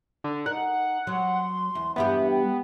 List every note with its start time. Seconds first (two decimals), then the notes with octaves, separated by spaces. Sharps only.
0.24 D3
0.46 D#4 A#4 F#5
1.07 F#3 C6
1.75 E2
1.96 E2 G2 B3 G4 E5
2.30 G5